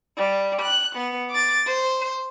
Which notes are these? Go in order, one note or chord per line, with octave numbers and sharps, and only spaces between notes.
G3
F#6
B3
D6 A6
C5